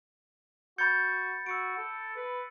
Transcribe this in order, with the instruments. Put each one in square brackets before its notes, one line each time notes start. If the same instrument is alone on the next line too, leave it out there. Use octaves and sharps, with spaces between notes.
[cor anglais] F#4 [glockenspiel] B5 A6 C#7 [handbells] G6
[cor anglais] F#4 [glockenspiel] E6 C#7 D7
[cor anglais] A4
B4